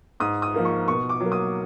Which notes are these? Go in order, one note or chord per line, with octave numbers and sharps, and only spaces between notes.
G#2 D#6
D#6
F3 A#3 D#4
C#6
B2 C#6
D6
F#3
A#3
D#6